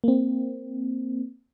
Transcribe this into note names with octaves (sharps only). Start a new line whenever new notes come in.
A#3 C4